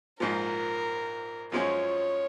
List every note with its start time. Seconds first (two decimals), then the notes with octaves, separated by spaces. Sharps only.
0.20 A#1 G#2 F3 A#4
1.52 F#2 F3 G#3 C#4 C#5